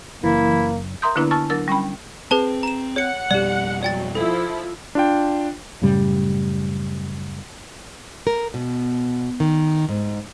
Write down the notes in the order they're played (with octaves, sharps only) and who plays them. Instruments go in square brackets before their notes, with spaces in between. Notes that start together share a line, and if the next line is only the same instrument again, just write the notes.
[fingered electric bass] F#1 [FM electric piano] E3 [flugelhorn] A#3 [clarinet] E4
[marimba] A#4 E5 A#5 C6 D#6 G6
D3 A#3 B3 D4 E4 B4
G#5 A5 C#6 E6 F6 A6
F#3 D4 A#4 E6 A6
G3 C#4 G5 B5
[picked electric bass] C4 [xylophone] G#4 B4 A5
[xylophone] A#5 E7
[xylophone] C#5 C#7 [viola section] F#5
[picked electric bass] F2 B2 G3 [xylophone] G4 D5
[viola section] F#3 [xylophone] D5 G5 A6
[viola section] F3 E4 [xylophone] A4
[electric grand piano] D4 F4 G5
[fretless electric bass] F#2 A2 C#3 G3
[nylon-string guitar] A#4
B2
D#3
G#2